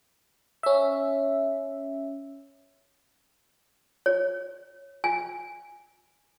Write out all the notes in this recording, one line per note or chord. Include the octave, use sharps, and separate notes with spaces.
C#4 E5
C#5
G#5